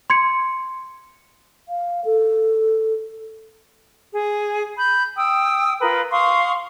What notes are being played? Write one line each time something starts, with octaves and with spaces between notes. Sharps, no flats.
C6 G#6 C#7
F5
A4
G#4
B5 G6
G5 D#6 E6
F4 A#4 B4
F5 C6 C#6 D#6